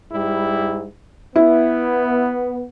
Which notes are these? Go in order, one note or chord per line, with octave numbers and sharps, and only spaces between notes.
G#2 G3 E4
B3 E4